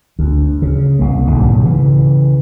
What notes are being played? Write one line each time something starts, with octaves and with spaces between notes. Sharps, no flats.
D2
C#3
C2 A#3
B1 G#2 B2 D3
C#3 E3